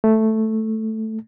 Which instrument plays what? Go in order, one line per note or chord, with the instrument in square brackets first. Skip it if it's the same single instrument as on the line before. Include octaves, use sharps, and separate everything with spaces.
[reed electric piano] A3